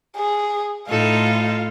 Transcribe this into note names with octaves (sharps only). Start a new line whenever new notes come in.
G#4
A2 D#4 F4 A4